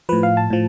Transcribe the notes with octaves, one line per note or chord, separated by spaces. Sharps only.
A2 F3 B4
F5
A5
A2 F3